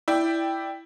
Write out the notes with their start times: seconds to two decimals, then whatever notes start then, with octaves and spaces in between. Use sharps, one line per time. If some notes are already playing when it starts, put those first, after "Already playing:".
0.08 E4 D5 G5